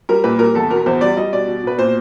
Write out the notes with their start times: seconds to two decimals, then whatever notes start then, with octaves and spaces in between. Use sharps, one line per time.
0.09 G3 A#4
0.24 A#2 B4
0.39 G3 A#4
0.55 E2 A4
0.70 B2 A#4
0.86 E2 C5
1.01 G3 D5
1.17 G3 D#5
1.33 B2 D5
1.47 B2
1.64 B2 B4
1.78 A#2 C5